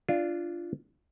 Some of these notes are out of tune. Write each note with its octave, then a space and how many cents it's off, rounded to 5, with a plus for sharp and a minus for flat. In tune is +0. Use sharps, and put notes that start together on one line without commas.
D4 +0 F4 -15